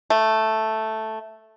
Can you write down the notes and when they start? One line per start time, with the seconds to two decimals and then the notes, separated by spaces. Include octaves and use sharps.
0.10 A3